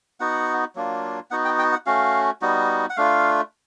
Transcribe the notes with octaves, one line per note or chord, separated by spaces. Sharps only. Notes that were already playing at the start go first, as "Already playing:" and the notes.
B3 D#4 F#4 F#5
F#3 A#3 D4 F4
B3 D#4 F#4 F#5
G5
G5
F#5
A3 C#4 F#4 F5
G3 B3 D#4 F#4
F#5
A3 D4 F4 F5